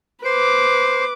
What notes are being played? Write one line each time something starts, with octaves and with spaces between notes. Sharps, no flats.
B4 C5 D6